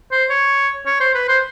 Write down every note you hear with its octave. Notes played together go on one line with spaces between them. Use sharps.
C5
C#5
C#5
C5
B4
C5